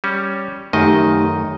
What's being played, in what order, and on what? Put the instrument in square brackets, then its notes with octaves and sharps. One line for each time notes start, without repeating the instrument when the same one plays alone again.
[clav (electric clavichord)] G3 C#4
[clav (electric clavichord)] F#2 D#3 D#5 [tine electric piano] A3 D#4 G4